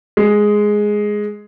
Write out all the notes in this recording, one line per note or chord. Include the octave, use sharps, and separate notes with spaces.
G#3